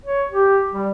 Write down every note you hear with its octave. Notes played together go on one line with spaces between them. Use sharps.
C#5
G4
G3